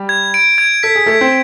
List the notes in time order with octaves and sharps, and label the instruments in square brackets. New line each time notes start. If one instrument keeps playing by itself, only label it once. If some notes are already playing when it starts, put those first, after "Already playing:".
Already playing: [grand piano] G3 G4
[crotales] G#6
D7
G#6
[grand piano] A4 [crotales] B6
[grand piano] G#4
[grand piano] A3 A4 [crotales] G#6
[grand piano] C4 C5